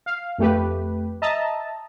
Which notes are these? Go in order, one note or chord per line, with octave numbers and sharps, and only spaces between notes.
F5
F2 A3 G4 B4
D#5 E5 A5 A#5